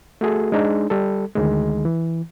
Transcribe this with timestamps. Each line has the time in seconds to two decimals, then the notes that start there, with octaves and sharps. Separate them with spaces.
0.21 A3 F#4 G#4 A4
0.52 G#3 D4 D#4
0.90 G3 A4
1.35 D2 D#3 G#3
1.85 E3